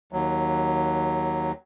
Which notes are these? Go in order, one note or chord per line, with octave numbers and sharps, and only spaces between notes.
D#2 F#3